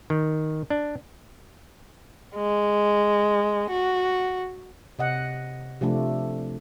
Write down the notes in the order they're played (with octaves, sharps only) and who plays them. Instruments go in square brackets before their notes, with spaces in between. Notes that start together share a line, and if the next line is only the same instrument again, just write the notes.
[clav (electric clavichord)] D#3
D4
[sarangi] G#3
F#4
[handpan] C3 D#5 F#5
C3 F3 A3 D4